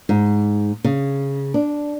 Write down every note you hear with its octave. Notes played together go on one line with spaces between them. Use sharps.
G#2
C#3
D4